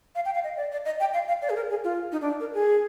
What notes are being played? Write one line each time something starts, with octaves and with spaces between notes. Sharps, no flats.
F5
G5
F5
D#5
D5
D5
D#5
G5
F5
F5
D5
G#4
A#4
G#4
F4
D#4
D4
A#4
G#4